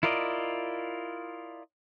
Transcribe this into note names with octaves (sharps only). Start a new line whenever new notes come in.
E4 F4 A#4 D5 D#5